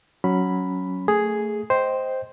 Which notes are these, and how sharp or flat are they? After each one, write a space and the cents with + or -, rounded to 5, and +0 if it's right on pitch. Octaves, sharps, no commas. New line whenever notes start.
F#3 +0 C#4 +0 B5 +0
A3 +20 G#4 +0
C5 +0 D#5 +5 G5 +0